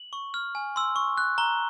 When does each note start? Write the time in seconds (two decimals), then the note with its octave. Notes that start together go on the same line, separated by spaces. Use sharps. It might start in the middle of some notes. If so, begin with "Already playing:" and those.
Already playing: F#7
0.13 C#6
0.34 F6
0.55 G#5
0.76 C6 E6
0.96 C#6
1.18 F#6
1.38 A#5 G7